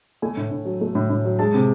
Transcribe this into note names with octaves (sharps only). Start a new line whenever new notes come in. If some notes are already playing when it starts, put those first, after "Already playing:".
A3 G#5
A2
A2
F#3
A3
A2
A2
F#3
G#3 A5
C3